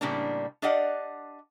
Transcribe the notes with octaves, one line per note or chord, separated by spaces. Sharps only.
A2 C#3 G3 A#3 C4 D4
D4 G4 D5 D#5 F5 F#5